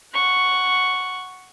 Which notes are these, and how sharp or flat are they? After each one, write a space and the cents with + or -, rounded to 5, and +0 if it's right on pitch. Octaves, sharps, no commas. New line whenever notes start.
F#5 +0 C#6 +0